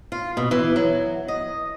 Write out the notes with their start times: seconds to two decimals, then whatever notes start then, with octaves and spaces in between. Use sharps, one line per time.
0.12 F4
0.37 B2
0.51 E3
0.76 F#3
1.28 D#5